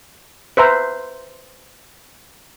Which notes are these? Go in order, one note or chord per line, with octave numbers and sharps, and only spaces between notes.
B4 C5 E5 A#5